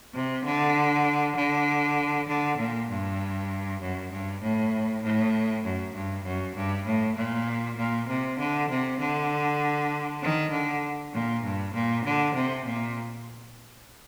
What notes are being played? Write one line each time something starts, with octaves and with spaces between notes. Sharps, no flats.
C3
D3
D3
D3
A#2
G2
F#2
G2
A2
A2
F#2
G2
F#2
G2
A2
A#2
A#2
C3
D3
C3
D3
D#3
D3
A#2
G2
A#2
D3
C3
A#2